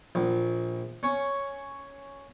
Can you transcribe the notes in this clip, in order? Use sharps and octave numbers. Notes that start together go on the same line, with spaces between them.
A#1
C#4